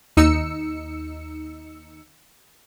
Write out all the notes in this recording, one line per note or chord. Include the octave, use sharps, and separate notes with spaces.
D#2 D#4 E6 C#7